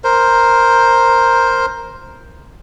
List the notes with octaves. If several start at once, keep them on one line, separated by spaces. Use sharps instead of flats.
A#4 C5